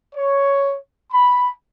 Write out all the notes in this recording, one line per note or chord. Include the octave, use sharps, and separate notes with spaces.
C#5
B5